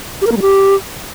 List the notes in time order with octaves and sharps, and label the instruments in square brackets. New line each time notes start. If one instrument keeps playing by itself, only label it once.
[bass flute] G4
A#4
A#3
G3
G4